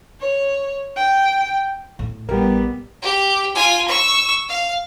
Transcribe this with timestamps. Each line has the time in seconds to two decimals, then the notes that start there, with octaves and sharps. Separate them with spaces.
0.20 C#5
0.96 G5
1.99 A2
2.29 A1 G3 B3 G4 A#4
3.02 G4
3.55 F4 G#5
3.88 C#6 E6
4.49 F5